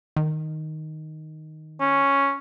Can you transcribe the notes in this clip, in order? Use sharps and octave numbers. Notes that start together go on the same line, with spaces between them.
D#3
C#4